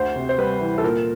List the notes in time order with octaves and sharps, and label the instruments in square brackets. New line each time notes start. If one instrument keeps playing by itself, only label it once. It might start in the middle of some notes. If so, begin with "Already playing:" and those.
Already playing: [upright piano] D2 C5
C3
C5
G3 B4
E3
A4
A#2 A#4